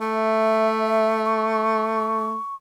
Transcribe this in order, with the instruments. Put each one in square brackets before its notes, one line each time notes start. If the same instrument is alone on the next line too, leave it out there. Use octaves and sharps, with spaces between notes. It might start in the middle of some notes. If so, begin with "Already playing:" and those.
[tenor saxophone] A3 [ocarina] E5
[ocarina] C#6